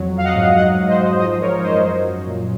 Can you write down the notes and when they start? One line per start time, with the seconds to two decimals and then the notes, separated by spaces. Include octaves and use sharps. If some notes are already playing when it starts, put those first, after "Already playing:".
Already playing: F2 F#3
0.14 F#3 F5
0.24 D#5 F#5
0.36 G#2
0.56 F#3 D#5 F#5
0.77 F#3
0.88 C5 D#5
0.99 G#2
1.20 F3 C5 D#5
1.41 F3 A#4 C#5
1.62 F#2 C5 D#5
1.83 F#3
2.05 F#3
2.27 A#2